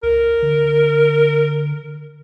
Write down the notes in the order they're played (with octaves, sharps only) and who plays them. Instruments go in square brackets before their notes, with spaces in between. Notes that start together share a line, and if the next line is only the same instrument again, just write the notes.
[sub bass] C#2 [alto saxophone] A#4
[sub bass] D3